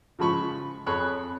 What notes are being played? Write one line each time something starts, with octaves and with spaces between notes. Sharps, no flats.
C#3 F3 G#3 B5 C#6
F2 G#4 C#5 B5 F#6